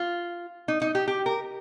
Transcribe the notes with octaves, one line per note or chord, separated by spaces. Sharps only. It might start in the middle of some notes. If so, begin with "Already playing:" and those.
Already playing: F4
D#4
D#4
G4
G4
A#4